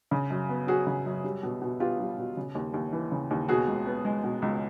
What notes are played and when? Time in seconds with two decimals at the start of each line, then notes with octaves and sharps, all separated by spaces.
0.11 C#3
0.30 F#2
0.49 B3
0.67 F#3 F#4 G#4
0.87 C#3
1.06 F#2
1.24 G3
1.43 B2
1.62 B2
1.80 B3 F4 G4
2.00 G3
2.18 B2
2.37 C#3
2.55 D#2
2.74 D#2
2.93 E3
3.12 C#3
3.31 D#2
3.49 B2 F#4 G#4
3.67 C#2
3.86 B3
4.05 G#3
4.24 B2
4.42 C#2